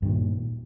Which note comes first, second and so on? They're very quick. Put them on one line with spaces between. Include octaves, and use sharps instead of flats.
G2 D#3 A#2